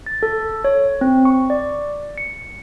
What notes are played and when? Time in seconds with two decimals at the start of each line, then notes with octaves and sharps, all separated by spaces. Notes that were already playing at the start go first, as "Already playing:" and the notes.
0.06 A6
0.23 A4
0.65 C#5
1.01 C4
1.25 C#6
1.50 D5
2.18 C#7